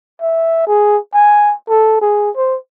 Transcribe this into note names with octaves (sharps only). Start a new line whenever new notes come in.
E5
G#4
G#5
A4
G#4
C5